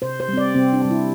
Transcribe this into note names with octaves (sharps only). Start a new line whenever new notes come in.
C3 C5
C5
G3
C4 D5
C3 C4
D4
G3 C4
E4